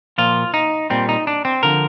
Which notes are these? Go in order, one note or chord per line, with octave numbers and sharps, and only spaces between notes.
A#2 F3 F4
D#4
A#2 G3 C4
D#4
D4
C4
D3 F3 A#4